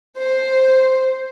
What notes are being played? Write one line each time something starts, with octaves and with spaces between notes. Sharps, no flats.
C5